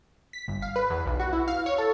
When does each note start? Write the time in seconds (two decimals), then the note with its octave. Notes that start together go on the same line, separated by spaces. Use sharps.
0.33 B6
0.48 G1
0.62 F5
0.76 B4
0.90 E2
1.06 B1
1.20 F#4
1.33 E4
1.48 F5
1.66 C#5
1.78 A4